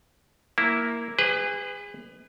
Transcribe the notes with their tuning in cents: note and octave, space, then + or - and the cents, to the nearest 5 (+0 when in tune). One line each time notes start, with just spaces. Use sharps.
A#3 +0 E4 +0
G#4 -30 B4 +25